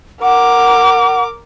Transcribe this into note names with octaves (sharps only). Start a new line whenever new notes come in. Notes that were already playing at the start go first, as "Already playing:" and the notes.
A#4 F#5 D6